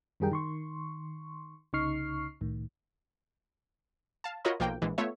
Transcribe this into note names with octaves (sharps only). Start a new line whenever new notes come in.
F#2 D#3 G3 G#4 A#4 G5
D#3 C6 C#6
C2 C#3 D#4 C#6 F6 C7
C2 A2 D#3
F5 A5
F4 F#4 A#4 C#5 D#5 B5
B1 F3 A#3 G5
A#1 E3 G#3
A3 B3 F4 C#5 E5